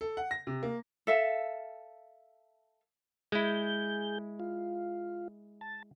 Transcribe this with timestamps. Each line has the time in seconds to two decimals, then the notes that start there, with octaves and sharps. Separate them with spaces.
0.01 A4
0.17 F#5
0.31 A#6
0.47 C3
0.63 A#3
1.07 A4 E5 F5
3.32 G#3 E4 G#4 G6
4.40 F4
5.61 A5